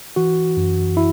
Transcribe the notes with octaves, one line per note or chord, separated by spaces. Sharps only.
E3 F#4
F#2
E4